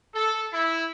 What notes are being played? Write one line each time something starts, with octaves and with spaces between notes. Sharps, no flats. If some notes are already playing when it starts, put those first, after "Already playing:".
A4
E4